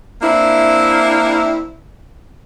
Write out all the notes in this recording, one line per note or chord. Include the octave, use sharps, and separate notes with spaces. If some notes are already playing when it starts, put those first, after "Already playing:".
A#3 C4 D4 E4 E5